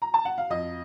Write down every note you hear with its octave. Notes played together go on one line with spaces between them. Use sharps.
A#5
A5
F#5
F5
F2 D#5